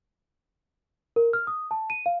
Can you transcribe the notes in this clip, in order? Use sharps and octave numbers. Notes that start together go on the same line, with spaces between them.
A#4
F6
D#6
A5
D#7
F5